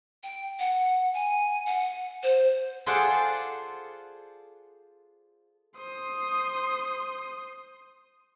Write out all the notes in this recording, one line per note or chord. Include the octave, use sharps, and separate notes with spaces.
G5
F#5
G#5
F#5
C5
F4 G#4 A4 C5 D5 F#5
C5 D#6